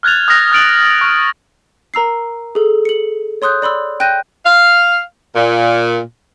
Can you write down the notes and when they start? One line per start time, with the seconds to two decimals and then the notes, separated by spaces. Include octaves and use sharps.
0.03 F6 F#6 G#6 A6 F7
0.28 D#6 F6 F#6 A#6 F7
0.52 F6 A6 D7 F#7
1.01 C#6
1.94 A#4 A#5 E6 C7
2.55 G#4 A4
2.85 C#7 F#7
3.42 C#5 C6 D#6 F#6 G6
3.62 D5 B5 C6 E6
4.00 G5 F#6 G6 A#6 D#7
4.45 F5
5.35 A#2